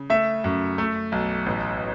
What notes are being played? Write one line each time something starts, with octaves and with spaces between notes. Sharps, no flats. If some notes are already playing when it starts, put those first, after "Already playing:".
Already playing: C#3
A3 E5
F#2
A3
B1
A1